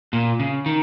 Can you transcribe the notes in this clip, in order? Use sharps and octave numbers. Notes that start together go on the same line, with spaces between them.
A#2
C#3
D#3